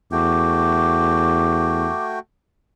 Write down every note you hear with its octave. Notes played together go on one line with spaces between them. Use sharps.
E2 A3 F#4 G5 D6